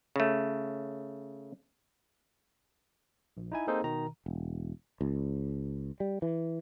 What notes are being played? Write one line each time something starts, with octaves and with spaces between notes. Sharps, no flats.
C#3 A3
A#1
D#4 E4 G#5
A#3 C4 D#4 G#4 A4 C5
B2 D#3 A#5
E1
C#2
G3
E3